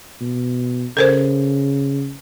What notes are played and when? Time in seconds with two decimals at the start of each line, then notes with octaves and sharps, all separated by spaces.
0.21 B2
0.97 C#3 A4 A#4 C5